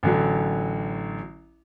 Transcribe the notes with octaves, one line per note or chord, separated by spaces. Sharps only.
A1 D3 F#3